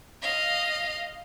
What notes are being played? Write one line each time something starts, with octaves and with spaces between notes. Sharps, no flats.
D#5 F5